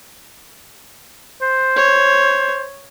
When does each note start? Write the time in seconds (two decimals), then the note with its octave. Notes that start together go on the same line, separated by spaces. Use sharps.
1.42 C5
1.76 C#5